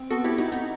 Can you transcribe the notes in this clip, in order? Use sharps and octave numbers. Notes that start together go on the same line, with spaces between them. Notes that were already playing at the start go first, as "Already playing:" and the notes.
Already playing: C4
B3 F#4 A4
E4 G4
B3 D#4 F#4
D#4